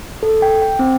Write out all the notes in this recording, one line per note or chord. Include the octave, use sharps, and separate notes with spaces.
A4
G5
G5
C4